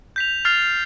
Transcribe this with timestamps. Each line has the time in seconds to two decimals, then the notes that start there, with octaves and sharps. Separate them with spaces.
0.16 G6 B6 F7
0.45 F6 A6 C7 F7